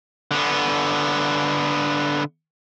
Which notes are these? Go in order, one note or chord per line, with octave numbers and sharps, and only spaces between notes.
D3 B3